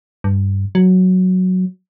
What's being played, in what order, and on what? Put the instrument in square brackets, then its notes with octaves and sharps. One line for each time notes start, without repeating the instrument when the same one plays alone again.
[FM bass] G2
F#3